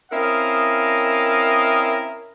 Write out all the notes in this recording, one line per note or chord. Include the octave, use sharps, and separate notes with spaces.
C4 C#4 E4 A#4 D#5 F5